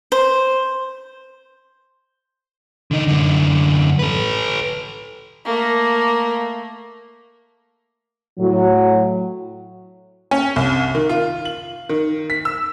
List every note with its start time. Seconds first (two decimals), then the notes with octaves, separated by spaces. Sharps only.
0.12 C5
2.91 D3 D#4
3.07 F#2 D3
3.99 A4 B4
5.45 A3 A#3
8.39 A2 F#3
10.31 C#4
10.56 C2
10.95 D#3
11.09 F4
11.45 F#7
11.89 D#3
12.30 B6
12.45 E6